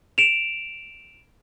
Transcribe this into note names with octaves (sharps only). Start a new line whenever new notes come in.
D7 E7 F7